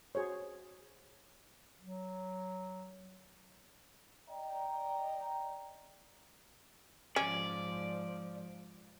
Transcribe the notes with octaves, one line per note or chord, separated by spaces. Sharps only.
F#4 G#4 C5 C#5
F#3
D5 D#5 G5 A#5
G#2 F3 C#4 D5